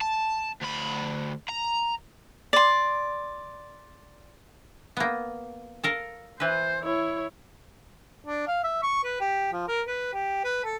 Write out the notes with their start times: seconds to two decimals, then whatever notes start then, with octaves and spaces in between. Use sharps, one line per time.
0.01 A5
0.61 D2 B5
1.49 A#5
2.53 D5 C6
4.97 A#3 B3
5.84 A4 A#4 F5
6.40 E3 B4 C5
6.82 E4 C#5
8.25 D4
8.47 F5
8.64 E5
8.82 C#6
9.03 B4
9.20 G4
9.52 F3
9.67 A#4
9.87 B4
10.13 G4
10.44 B4
10.64 A4